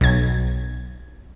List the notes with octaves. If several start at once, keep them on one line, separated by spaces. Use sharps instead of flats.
B1 G#6